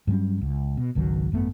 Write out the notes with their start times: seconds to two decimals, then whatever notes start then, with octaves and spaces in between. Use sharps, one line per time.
0.07 G2 F#3 G3 C#4
0.41 C#2
0.77 B2
0.95 G#1 C#2 D#3 F#3
1.32 G#1 F#2 A3 B3